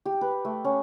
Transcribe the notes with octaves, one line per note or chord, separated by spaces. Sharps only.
G4
B4
A3
C#4